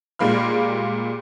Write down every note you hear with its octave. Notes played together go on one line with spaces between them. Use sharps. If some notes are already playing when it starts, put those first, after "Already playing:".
A#2 G3 G#3 A#3 B5 F6